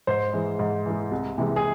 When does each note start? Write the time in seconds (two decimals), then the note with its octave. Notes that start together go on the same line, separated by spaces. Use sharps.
0.07 G#2 C5
0.33 E3 G#3
0.59 G#2
0.85 E3
0.90 G#3
1.12 C2
1.38 C3 E3 G#3
1.56 G#4